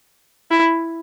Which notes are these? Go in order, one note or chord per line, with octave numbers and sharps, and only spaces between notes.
E4